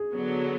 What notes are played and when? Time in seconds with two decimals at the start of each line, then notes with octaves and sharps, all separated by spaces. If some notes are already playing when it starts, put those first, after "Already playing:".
Already playing: G#4
0.15 D3 F#3 B3